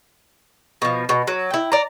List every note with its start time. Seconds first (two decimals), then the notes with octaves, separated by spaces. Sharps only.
0.82 B2 F3
1.09 B2
1.27 F#3
1.51 E4 G5
1.72 D5 A#5